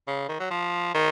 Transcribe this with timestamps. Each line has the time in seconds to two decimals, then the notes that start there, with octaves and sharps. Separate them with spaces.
0.08 C#3
0.29 D#3
0.40 F#3
0.51 F3
0.95 D#3